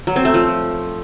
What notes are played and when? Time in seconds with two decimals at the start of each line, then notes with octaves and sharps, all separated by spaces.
0.07 F#3
0.16 C4
0.25 A3
0.34 F3